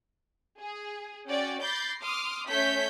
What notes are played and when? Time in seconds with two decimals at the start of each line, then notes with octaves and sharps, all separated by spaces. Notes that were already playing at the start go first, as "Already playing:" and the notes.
0.59 G#4
1.27 C#4 F#4 D5 G5
1.61 B5 D6 G6 A6 A#6 C7
2.00 C6 D6 D#6 F6
2.47 A3 C#4 C#5 E5 G6 B6